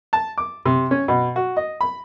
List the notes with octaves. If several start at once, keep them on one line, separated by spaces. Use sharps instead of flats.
A5
D6
C3
C#4
B2
F#4
D#5
B5